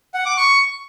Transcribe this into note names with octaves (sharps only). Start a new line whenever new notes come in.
F#5
D6
C#6